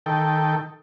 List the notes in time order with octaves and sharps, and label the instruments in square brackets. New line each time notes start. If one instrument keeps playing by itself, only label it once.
[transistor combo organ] D#3 A4 G5